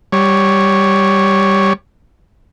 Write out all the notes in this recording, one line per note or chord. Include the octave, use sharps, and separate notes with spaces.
G3 C#5